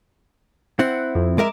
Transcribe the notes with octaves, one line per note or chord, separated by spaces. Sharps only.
C4 E4 F#5
F2
G#3 A#4 E5 D6